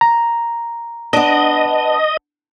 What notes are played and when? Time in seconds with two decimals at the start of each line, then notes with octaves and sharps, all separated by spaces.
0.01 A#5
1.13 B3 D4 D#5